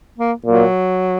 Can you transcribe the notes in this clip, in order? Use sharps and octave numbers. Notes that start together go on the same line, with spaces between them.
A#3
A#2 F#3